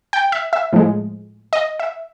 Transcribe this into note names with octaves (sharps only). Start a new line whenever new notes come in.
G5
E5
E5
A2 F3 G#3
D#5
E5